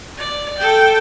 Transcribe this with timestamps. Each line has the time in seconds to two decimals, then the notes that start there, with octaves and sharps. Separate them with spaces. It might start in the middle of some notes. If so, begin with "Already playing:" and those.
0.18 D5
0.58 A4 G5